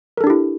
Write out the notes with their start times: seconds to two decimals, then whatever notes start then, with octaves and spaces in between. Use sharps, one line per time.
0.17 A#4
0.21 A4
0.24 D4
0.27 G4
0.30 E4